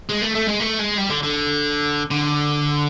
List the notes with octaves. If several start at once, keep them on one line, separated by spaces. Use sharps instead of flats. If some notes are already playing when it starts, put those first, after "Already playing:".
G#3
A3
A3
G#3
A3
G#3
G3
D3
D3
D3